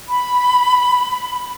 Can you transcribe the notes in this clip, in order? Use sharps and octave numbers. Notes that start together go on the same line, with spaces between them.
B5